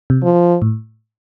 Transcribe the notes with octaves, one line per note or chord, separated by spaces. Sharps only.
C3
F3
A2